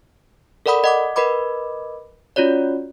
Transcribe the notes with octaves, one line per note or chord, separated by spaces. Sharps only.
A4 A#4 D5 F#5 B5 D#6
D#5 F#5 D6
A#4 B4 D#5 B5 D6
C#4 F4 F#4 C#5 D5